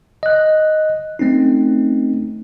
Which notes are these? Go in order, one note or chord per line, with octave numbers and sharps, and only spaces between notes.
D#5 F#6
A3 C4 C#4 D#4